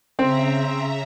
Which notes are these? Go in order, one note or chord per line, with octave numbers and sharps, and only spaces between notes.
C#3 C4 E5 A#5